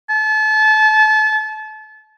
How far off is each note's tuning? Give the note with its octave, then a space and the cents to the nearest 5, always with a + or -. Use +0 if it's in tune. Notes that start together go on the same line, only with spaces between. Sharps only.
A5 -30